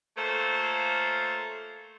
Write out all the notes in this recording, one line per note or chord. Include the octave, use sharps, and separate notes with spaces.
A3 A#3 F4 A4 C5 C#5